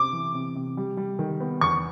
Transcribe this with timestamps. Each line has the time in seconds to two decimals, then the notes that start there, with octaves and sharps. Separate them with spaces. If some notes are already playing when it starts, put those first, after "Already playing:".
Already playing: C3 D6
0.13 E3
0.34 C3
0.55 C3
0.77 G3
0.97 G3
1.19 D#3
1.40 B3
1.61 E2 C#6